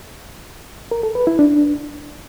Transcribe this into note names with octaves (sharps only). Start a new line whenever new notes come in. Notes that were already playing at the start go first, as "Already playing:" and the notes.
A#4
A4
B4
E4
D4